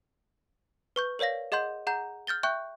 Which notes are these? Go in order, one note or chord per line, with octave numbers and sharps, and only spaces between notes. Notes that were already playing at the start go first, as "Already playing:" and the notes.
B4 C#6 G6
A#4 C#5 D5 F5 A#6
G#4 D#5 F#5 C6 G6
G#4 F#5 A#5 G6
F6 G6 A6 G7
E5 G5 C#6 F#6 G6